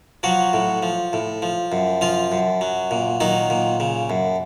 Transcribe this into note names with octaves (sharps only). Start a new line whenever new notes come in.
F3 F#3 F#4
A2
F3
A2
F3
F#2
F3 F4
F#2
F#3
A#2
D#3 F#3 D#4
A#2
C#3
F#2